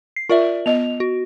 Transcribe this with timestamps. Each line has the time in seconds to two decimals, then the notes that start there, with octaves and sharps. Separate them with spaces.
0.16 C7
0.30 F4 A#4 D5 E5
0.66 B3 D#5 F7
1.00 F#4